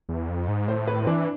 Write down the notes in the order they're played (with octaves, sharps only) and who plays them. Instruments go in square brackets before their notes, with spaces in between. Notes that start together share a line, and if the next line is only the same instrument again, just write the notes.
[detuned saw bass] E2
F2
G#2
[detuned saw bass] A2 [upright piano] C5
[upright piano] B4
C4
[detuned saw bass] E3 [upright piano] D4